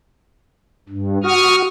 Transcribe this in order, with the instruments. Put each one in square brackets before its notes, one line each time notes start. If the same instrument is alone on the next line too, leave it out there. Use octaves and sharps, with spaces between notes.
[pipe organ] G2
[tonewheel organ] F#4 [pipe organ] C#6 D#6 F6